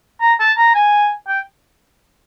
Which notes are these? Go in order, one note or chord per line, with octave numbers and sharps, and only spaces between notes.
A#5
A5
A#5
G#5
G5